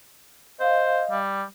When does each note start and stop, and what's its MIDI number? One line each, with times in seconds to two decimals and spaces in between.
0.60 1.02 72
0.60 1.17 75
0.60 1.17 77
1.11 1.43 55